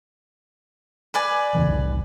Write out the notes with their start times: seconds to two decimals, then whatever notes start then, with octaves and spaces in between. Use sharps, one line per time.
1.14 B4 D5 G#5
1.55 E2 C#3 E3
1.67 F1 C2